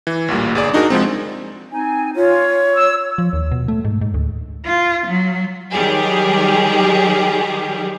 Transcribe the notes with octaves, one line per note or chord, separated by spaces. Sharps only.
E3
A1 D2 A#2 G3
G1 G#4 D5
D4 D#4 F#4 G#4 A#4
C2 F3 G#3 C4
C4 D#4 G#5
F4 C#5
E6
F3
D#2
B2
A3
G#2
G#2
D2
F4
F#3
D#3 F#3 G3 G4 G#4